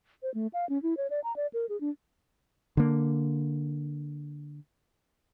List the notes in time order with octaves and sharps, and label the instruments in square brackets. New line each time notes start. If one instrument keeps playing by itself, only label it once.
[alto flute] C5
A3
F5
C#4
E4
C#5
D5
A#5
D5
A#4
G#4
D4
[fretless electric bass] D3 A#3